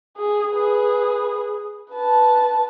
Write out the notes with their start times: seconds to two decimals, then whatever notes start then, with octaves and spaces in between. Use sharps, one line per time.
0.17 G#4
0.52 G#4 B4
1.92 B4 A5